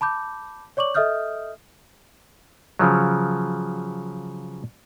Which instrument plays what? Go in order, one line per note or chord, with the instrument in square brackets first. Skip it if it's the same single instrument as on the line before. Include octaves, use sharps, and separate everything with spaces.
[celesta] A5 B5 D6 G6
C#5 D5 C#6 D6 F#7
A4 D#5 E5 D#6 F6 G6
[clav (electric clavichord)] C#3 F3 F#3